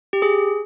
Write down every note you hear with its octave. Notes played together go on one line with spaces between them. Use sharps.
G4
G#4